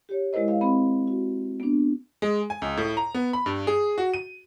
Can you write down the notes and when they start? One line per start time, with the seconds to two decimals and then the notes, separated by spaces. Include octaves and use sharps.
0.09 G4 C#5
0.33 G#3 E4 A#4 C5 D#5
0.48 F5
0.61 C4 B5
1.07 F#4
1.60 B3 D4
2.22 G#3
2.50 G#5
2.62 C#2
2.77 A2
2.97 A#5
3.14 B3
3.33 B5
3.46 G2
3.67 G#4
3.98 F#4
4.14 D#7